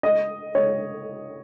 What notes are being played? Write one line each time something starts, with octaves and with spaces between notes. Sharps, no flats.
D#5
C#5